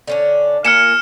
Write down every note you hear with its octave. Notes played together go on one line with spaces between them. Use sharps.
D3 C#4 D4
A#3 F4 G#5 F6 C#7 E7